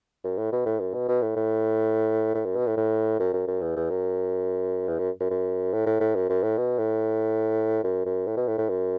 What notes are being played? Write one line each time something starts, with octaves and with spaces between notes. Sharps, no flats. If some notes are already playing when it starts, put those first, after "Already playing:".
F#2
A2
B2
A2
F#2
B2
B2
A2
A2
A2
F#2
B2
A2
A2
F#2
F#2
F#2
E2
E2
F#2
E2
F#2
F#2
F#2
A2
A2
A2
F#2
F#2
A2
B2
A2
F#2
F#2
A2
B2
A2
A2
F#2